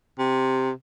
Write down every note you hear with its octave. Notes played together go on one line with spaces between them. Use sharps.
C3